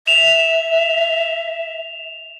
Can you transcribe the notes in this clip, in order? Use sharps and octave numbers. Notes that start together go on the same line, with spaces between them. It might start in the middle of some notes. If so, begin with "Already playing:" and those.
E5 E7 F7